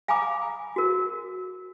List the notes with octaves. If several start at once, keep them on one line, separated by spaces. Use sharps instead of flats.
F5 G#5 A#5 B5 D6 D#6
F#4 A#4